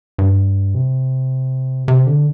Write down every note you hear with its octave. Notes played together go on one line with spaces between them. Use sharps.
G2
C3
C3
D3